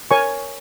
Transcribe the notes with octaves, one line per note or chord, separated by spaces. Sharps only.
A#4 C#5 G#5 C#6